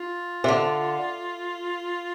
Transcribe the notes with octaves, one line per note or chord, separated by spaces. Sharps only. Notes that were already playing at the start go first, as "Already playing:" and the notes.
Already playing: F4
C3
D3